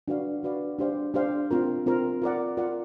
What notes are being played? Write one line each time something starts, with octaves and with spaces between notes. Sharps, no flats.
D4 F#4 B4 D5 F5
D4 F#4 B4 D5 F5
D4 G4 C5 F5
D4 G4 C5 F5
C4 F4 A#4
C4 F4 A#4
F4 A#4 D5 F#5
F4 A#4 D5 F#5